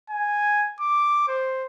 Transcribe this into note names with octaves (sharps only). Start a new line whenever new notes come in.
G#5
D6
C5